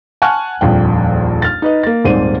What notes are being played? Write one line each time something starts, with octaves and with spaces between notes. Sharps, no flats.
F#5 G#5 A5 C#6 F6 F#6
D#1 A#1 F2 G5
F6 A6
D#4 B4 D#5
A#3 A6
D#1 G#2 C4 C5 D5 D#7